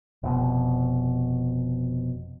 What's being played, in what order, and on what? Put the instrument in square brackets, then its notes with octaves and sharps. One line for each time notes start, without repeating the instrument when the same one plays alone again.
[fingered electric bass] F1 B2